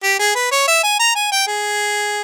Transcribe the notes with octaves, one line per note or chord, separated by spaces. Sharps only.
G4
G#4
B4
C#5
E5
G#5
A#5
G#5
G5
G#4